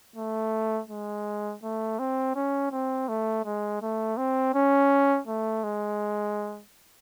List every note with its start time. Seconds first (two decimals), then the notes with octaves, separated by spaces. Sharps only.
0.16 A3
0.89 G#3
1.63 A3
1.99 C4
2.36 C#4
2.72 C4
3.08 A3
3.45 G#3
3.82 A3
4.17 C4
4.54 C#4
5.28 A3
5.64 G#3